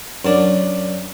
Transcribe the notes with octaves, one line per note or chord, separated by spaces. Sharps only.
F#2 D4